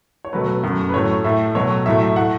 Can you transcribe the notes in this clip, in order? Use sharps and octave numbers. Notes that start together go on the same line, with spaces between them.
C#5
B2 F#3 A3 B4
B4
F#2 F#3 A3
B4
A2 F#3 A3 C#5
A2 A3 E5
B2 F#3 A3 C#5
A2 F#3 A3 E5
E5
A2 A3 F#5